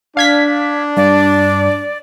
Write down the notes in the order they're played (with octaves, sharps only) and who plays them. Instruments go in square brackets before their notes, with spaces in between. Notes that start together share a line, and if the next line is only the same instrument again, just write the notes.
[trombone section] D4 [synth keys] F5 G#6 B6
[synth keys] G2 [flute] D5